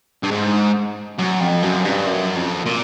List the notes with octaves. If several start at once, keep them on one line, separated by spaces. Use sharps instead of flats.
G2
G#2
F#2
F2
F#2
G2
F#2
F2
A#2